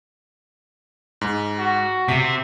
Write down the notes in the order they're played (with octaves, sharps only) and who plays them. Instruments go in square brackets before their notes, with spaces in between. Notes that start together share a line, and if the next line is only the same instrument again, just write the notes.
[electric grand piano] G#2
[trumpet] F#4
[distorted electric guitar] C3 [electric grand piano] B6